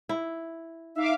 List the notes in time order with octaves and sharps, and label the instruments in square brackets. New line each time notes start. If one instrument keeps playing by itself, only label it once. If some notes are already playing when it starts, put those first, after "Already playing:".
[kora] E4
[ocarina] D#4 [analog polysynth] E5 F5 D6